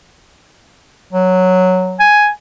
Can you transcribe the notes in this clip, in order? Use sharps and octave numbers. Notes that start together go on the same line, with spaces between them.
F#3
G#5